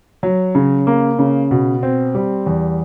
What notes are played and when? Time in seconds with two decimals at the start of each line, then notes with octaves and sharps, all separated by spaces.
0.23 F#3
0.55 C#3
0.87 A#3
1.19 C#3
1.51 B2
1.83 C4
2.15 G3
2.46 E2